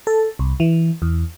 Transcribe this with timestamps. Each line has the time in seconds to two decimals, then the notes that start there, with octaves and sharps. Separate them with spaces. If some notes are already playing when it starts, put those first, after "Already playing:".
0.07 A4
0.39 C2
0.60 E3
1.02 E2